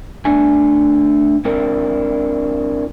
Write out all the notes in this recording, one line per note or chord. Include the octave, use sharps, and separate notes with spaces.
A3 D4 G#5
G#3 C4 D4 E4 A#4